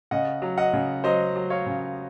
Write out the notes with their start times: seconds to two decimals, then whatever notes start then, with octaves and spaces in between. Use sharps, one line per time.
0.11 C#3 D#5 F#5
0.42 F#3
0.58 D#5 F#5
0.73 C#3
1.04 F#3 C5 D#5
1.36 F#3
1.50 C#5 F5
1.66 C#3